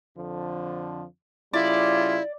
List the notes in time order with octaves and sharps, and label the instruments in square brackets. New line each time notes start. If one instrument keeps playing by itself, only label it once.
[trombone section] F2 D3 F3
[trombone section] C#3 G3 F4 [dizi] E4 [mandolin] D5